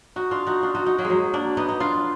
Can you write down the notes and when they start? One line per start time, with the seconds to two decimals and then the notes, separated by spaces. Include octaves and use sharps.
0.16 D#4 F#4
0.31 D4 F4
0.47 D#4 F#4
0.63 D4 F4
0.75 D#4 F#4
0.86 D#4 F#4
0.98 F#3 A#3
1.05 G#3
1.10 F#3
1.33 A#3 D4
1.57 B3 D#4
1.69 D#4
1.80 D4 F4